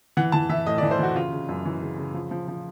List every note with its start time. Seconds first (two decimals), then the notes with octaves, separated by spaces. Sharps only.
0.17 E3 F#5
0.32 E3 A5
0.49 E3 E5
0.66 A2 D#5
0.78 D5
0.82 E3
0.91 C5
0.99 E3 F#4
1.15 C#3 F4
1.32 C#3
1.49 F#2
1.65 E3
1.82 C#3
1.98 C#3
2.14 F3
2.31 F3
2.48 F3